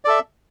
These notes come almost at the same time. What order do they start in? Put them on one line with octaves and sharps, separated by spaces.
D5 A4 E5